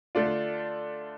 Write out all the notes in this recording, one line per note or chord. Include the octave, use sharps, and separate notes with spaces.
D3 A3 D4 F4